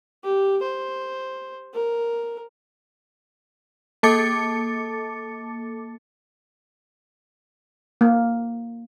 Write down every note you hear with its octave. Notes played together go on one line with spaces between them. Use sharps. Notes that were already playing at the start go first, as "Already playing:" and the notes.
G4
C5
A#4
A#3 A4 A5 D6 A6 C#7
A#3